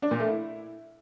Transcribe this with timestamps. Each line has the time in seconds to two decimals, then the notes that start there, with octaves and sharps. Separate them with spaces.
0.02 D4
0.11 A#2
0.20 A3
0.28 E4